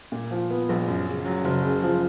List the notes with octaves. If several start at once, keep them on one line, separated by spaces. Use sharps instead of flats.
A#2
F3
B3
A#1
F#2
C#3
F#3
F#1
C#3
F3